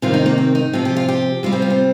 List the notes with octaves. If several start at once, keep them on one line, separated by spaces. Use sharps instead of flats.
C3 D#3 G3 F4
D#4
A#3
C4
D#4
C3 F3 F4
G4
F4
G4
C3 G3 F4
C4
F4
C4